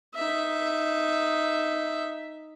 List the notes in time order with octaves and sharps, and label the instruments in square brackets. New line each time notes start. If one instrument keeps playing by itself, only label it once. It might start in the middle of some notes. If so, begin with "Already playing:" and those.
[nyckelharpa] D#4 E5